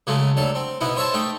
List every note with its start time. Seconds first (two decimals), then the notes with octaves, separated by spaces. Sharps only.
0.07 C#3 F#3 G#3 A3
0.37 D2 F#3 A4
0.55 C4
0.81 B2 B3 D#4 E4
0.97 C5 C#5 E5 A5
1.14 A3 D#4 G5